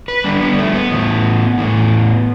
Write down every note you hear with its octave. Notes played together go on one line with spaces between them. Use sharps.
B4
D3 G3 D4
B3
A3
B3
A2 E3 A3
A2 E3 A3